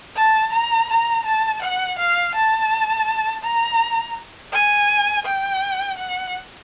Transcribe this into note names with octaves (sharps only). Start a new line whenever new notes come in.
A5
A#5
A#5
A5
F#5
F5
A5
A#5
G#5
G5
F#5